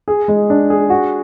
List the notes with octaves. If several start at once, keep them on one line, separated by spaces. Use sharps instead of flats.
G#4
G#3
D4
G#4
F#4